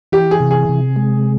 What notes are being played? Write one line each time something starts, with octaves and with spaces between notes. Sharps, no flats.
E3 G4
G#4
C3
G#4
C3
G#3